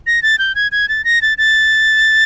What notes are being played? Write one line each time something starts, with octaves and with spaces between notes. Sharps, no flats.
A#6
A6
G6
G#6
G#6
A6
A#6
A6
A6